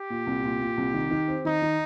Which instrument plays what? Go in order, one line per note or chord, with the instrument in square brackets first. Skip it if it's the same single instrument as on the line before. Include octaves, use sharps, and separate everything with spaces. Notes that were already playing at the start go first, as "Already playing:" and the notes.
Already playing: [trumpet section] G4
[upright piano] A#2
C2
A#2
A#2
C2
D#3
D#3
C4
[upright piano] D#3 [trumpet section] D#4
[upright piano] D#3